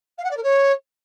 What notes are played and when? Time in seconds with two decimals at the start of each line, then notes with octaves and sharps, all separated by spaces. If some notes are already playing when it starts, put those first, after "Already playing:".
0.18 F5
0.24 F#5
0.30 D5
0.37 A#4
0.43 C#5